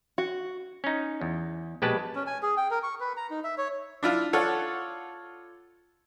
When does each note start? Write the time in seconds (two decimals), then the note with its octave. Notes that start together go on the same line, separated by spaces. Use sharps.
0.18 F#4
0.84 C#4 D#4
1.21 E2
1.82 A#1 B2 G#3 G4 B4 A5
2.15 C#4
2.27 G#5
2.43 G#4
2.57 G5
2.71 A#4
2.83 C#6
3.00 B4
3.17 A#5
3.30 D#4
3.44 E5
3.58 C#5
4.03 D4 E4 F4
4.33 F4 A4 C#5 D5 F#5